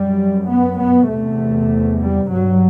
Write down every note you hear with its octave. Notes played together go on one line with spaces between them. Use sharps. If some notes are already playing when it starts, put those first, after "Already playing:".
Already playing: F#2 G3
B3
B3
E2 C3 A3
G3
G2 F#3